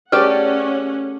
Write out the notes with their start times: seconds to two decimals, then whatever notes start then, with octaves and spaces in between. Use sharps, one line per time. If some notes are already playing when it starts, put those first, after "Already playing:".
0.12 A3 C#4 G4 G#4 B4 D5 F#5